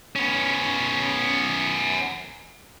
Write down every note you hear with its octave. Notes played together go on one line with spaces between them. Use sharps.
B3 C#4